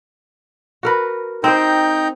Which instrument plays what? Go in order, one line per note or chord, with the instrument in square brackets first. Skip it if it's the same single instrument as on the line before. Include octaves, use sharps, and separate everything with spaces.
[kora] F#4 A#4 B4
[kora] C4 C5 [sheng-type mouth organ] D#4 G5 A#5